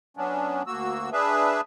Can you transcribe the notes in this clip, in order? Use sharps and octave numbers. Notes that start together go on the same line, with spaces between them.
F#3 B3 C#4 D4
D2 A#3 F#4 E6
D4 G#4 B4 E5